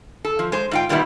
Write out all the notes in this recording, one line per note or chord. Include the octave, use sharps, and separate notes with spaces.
A4
F3
G#3 C5
G#2 F4 G5
A#2 D#3 G3 B3 E4